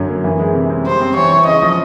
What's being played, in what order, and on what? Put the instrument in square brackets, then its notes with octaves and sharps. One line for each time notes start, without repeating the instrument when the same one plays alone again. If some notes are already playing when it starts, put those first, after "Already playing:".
Already playing: [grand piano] F#2 D3 F#3
A#3
E3
G#3
C3
C4
[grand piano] G3 [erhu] C5
[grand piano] C4
[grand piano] E3 [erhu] C#5
[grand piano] E4
[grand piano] C#3 [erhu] D#5
[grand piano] F3